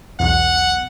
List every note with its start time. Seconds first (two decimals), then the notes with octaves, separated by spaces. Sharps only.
0.20 B1 E2 F#5